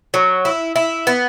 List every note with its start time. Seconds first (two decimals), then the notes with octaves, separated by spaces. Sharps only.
0.14 F#3
0.45 E4
0.76 E4
1.07 B3